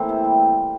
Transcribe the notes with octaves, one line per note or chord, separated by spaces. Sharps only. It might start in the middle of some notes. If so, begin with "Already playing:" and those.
Already playing: E3 A3 A#3 C4
C3
G3